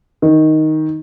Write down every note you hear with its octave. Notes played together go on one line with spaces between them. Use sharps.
D#3